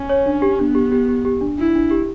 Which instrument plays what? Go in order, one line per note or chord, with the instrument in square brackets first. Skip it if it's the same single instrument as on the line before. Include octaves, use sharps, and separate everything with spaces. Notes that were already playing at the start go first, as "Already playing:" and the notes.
Already playing: [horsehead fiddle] C#4
[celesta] C#5
D4
G4
[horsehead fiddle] B3 [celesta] D4
[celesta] G4
G4
G4
G4
D4
[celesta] D4 [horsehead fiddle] E4
[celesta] D4
G4